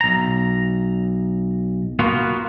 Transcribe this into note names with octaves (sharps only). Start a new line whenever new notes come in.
B1 A#5
A#3 B3 F4 F#4